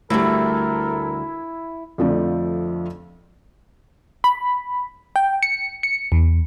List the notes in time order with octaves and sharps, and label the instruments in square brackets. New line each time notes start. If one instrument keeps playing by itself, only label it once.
[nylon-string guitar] D2 G3 [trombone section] A3 A4 A#4 [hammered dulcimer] E4
[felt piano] F2 D3 F3 A3 D4
[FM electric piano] B5
G5
C#7
C#7
E2